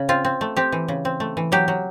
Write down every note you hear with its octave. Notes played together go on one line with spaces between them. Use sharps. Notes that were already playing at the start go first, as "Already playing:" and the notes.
Already playing: C#3
C4 F4
C4
A3
C4 G4
E3
C#3
C4
A3
E3
F#3 G4
F#3